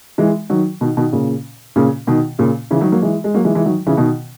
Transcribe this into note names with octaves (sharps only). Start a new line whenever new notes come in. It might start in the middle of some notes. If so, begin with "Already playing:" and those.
E3 G#3
D#3 F#3
B2 D#3
B2 D#3
A#2 C#3
A#2 C#3
B2 D#3
A#2 C#3
C#3 E3
D#3 F#3
F#3 A#3
E3 G#3
G#3
F#3 A#3
E3 G#3
E3 G#3
D#3 F#3
C#3 E3
B2 D#3